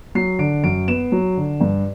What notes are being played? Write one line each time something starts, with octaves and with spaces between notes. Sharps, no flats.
F#3 C7
D3 D7
F#2 D7
B3 E7
F#3
D3
G2